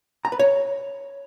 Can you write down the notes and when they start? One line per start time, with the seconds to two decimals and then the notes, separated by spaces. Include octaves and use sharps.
0.25 A#5
0.32 B4
0.39 C#5